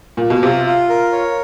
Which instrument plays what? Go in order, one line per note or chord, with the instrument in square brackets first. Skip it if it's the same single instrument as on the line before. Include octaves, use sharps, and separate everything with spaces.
[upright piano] A#2
B2
[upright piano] C3 [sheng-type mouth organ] F4
[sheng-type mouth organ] F4
A#4
C#5